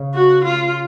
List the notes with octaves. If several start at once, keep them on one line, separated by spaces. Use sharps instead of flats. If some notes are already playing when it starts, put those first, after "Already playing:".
Already playing: C#3
F#4
F4